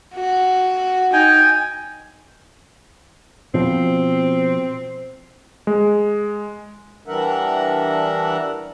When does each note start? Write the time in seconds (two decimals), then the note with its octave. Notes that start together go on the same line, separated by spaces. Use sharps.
0.15 F#4
1.13 D#4 G5 G#5
3.54 B2 F3 C4
5.67 G#3
7.07 E3 G3 D4 A#4 E5 F#5